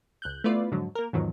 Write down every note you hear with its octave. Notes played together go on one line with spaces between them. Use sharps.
C#2 F#6 G6
A3 B3 E4 F4 B4 D5
F2 G#2 D3 F#3
A#3 A#4
E2 G#2 B2 D#3 F3 F#3